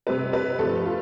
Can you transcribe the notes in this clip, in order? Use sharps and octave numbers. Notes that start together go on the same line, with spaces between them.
C3 G3 C4 B4
B4
G2 F3 A3 C4 A4
F4